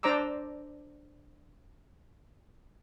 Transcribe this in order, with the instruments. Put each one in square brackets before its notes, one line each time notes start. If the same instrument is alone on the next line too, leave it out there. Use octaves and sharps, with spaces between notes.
[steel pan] D4 C5 D5 A#5 D6 E6